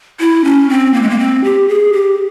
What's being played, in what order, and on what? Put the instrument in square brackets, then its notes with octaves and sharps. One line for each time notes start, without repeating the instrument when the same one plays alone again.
[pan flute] E4
C#4
C4
A#3
G#3
A#3
C4
G4
G#4
G4